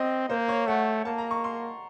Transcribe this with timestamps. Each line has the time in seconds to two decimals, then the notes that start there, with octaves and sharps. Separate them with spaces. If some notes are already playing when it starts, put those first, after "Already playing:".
Already playing: C4 D#5
0.29 A#3 C5
0.48 C#5
0.67 A3 F#5
1.05 A#3 A5
1.18 A#5
1.31 C#6
1.44 C6